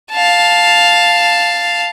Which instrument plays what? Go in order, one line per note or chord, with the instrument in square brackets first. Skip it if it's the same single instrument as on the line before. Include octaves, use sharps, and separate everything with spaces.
[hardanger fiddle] F5 A5